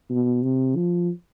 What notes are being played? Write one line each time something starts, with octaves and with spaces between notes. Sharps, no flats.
B2
C3
F3